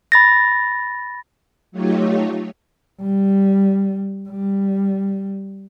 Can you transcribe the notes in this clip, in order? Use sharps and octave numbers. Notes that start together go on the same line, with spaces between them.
B5 A6 A#6
F#3 A3 D#4 F4 G4 C#5
G3
G3